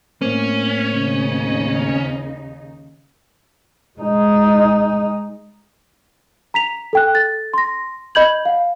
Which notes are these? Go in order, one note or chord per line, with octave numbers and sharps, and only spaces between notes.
A2 A#3 C4 C#4
D#2 C#3 D#4
G#3 D#4
A#5 B6 F7
A4 G5 F#6
A4 A6
C6 A#6
D#5 B5 G6 G#6 F#7
F5 F#5